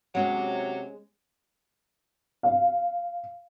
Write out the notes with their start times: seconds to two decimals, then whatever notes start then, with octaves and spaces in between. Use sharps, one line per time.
0.15 C3 F#3 G#3 C#4
2.43 F5